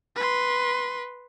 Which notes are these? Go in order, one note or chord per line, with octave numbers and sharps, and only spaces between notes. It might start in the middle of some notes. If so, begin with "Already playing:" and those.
B4 C6